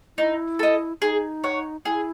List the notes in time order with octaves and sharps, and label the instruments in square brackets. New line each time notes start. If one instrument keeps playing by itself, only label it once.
[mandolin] D#4 [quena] E4
[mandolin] A4 D#5
[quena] D#4 [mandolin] G#4
[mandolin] C#5 F#5
[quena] E4 [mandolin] G#4